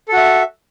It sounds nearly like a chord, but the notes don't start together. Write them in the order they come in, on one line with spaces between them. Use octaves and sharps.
A4 F#4 E5